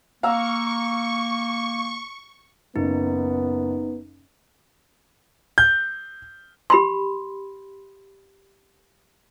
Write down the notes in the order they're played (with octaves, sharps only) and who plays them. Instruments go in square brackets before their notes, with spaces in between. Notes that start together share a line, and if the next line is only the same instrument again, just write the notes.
[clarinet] A#3 [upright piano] F5 A#5 E6 [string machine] C#6
[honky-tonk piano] F#1 [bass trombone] B3 [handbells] D#4
[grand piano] G6
[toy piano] G4 B5 C6